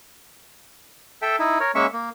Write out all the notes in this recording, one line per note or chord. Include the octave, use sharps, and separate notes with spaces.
A4 E5 G5
D#4 E4
A#4 C#5
G#3 A#3 C#4 E5 C#6
A#3